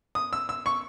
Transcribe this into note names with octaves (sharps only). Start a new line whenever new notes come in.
D#6
E6
E6
C#6